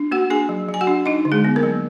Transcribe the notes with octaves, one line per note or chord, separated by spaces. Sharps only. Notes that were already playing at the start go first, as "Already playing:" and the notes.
Already playing: D4
A#3 F#4 F#5
D4 G#4 G#5
F#3
F#3
G#5
F#4 F#5
D4
D4 D#4 D#5
D3
G#3 G#4
B3
A#3 A#4
F#3